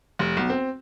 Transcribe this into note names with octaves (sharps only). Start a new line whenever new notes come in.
F1
B1
C4